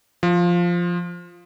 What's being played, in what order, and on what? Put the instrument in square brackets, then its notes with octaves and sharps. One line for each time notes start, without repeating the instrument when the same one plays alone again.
[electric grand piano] F3